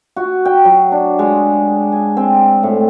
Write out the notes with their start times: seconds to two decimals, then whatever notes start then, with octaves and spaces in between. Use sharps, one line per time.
0.16 F#4
0.45 G5
0.65 F#3
0.92 D4
1.19 G#3
1.92 G#5
2.17 C4
2.63 A2